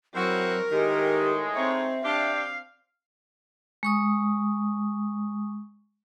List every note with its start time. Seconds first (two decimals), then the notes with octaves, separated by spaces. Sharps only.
0.15 F#3 C4 E4 F#4 A#4
0.71 A2 D#3 G#3 G4
1.55 C4 D#4 C#5 E5
2.05 D4 G4 F5
3.83 G#3 C#6 D#6